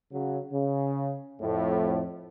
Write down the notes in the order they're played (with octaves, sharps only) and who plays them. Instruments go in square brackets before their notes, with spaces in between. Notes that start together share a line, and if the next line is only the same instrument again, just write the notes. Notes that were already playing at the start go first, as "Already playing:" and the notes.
[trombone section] C#3 F#3
C#3
F2 A2